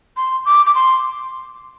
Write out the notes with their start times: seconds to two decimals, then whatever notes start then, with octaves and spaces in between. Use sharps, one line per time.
0.17 C6
0.46 D6
0.66 D6
0.75 C6